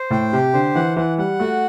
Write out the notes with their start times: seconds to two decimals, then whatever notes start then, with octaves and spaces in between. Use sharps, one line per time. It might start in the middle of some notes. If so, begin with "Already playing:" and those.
Already playing: C5
0.11 A2 G5
0.32 C3 G4
0.54 D3 C5
0.75 E3 F#5
0.97 E3 F#5
1.18 G3 F#5
1.40 A3 F#4